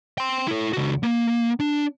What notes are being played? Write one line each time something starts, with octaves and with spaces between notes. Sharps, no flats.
G5 C6
E4 A4
C#2 F#4
A#3
D4